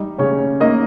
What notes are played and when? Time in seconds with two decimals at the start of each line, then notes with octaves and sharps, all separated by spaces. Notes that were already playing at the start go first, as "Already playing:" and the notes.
Already playing: G3 D#4
0.18 C#3 C#4 C#5
0.60 A#3 D#4 D#5